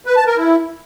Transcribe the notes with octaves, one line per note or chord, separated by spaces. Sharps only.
B4
A5
A#4
E4